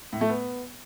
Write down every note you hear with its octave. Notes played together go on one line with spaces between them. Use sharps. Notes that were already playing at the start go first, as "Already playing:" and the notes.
A2
A3
B3